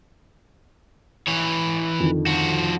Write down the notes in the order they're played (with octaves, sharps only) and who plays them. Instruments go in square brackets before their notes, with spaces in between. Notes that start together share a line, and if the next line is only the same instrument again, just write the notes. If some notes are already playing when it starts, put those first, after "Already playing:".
[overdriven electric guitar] E3 C#5
[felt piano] F2 D3 D#3
[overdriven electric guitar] F3 F#4